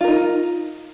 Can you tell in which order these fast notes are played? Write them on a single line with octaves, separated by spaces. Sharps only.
F4 A#4 D#4